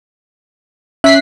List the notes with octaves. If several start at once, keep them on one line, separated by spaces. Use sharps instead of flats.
C#4 E5 F#6 B6 C7